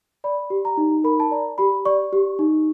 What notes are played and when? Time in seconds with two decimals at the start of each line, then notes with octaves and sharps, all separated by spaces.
0.24 D5 B5
0.50 G4
0.65 A#5
0.77 D#4
1.04 A#4 B5
1.20 A5
1.31 D5 A#5
1.58 G4 B5
1.85 D5 C#6
2.13 G4
2.39 D#4